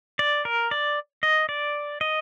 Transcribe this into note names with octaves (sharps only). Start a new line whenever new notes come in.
D5
A#4
D5
D#5
D5
D#5